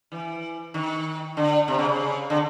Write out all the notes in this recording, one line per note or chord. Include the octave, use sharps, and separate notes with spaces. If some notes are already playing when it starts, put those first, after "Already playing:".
E3
D#3
D3
C3
C#3
C#3
D3